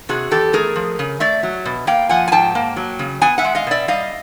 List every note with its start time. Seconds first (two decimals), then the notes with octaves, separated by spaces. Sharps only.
0.09 C3 F#4 G#4
0.31 E2 G4 A4
0.53 A3 G#4 A#4
0.76 F3
0.99 C#3
1.20 A3 D5 E5
1.43 F#3
1.65 B2
1.87 A#3 F5 G5
2.09 F3 F#5 G#5
2.28 G#5
2.32 G#2 G5 A5
2.55 A#3
2.76 F#3
2.99 C#3
3.21 B3 F#5 G#5
3.38 E5 F#5
3.44 G#3
3.55 D#5 F5
3.67 B2 D5 E5
3.88 G3 D#5 F5